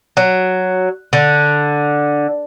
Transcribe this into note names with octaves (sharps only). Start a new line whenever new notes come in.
F#3
D3